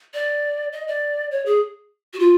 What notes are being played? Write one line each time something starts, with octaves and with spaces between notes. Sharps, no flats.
D5
D#5
D5
C#5
G#4
F#4
F4